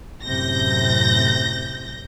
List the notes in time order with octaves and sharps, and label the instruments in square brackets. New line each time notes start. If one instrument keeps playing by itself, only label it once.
[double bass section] F#2 A2 C3 [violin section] G6 A#6